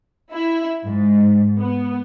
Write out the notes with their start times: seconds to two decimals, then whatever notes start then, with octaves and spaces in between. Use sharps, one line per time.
0.33 E4
0.85 G#2
1.58 B3